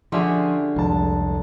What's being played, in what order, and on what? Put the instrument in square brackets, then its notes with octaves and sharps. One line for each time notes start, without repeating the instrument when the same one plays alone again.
[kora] D3 C#4 G4 [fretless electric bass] F3 [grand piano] G#4 E5 C6
[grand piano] F1 G#3 A5 [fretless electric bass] C2 E3 F3